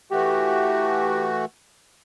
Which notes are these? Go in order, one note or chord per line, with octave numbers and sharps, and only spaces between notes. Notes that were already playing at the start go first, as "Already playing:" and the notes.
E3 A3 F#4 G4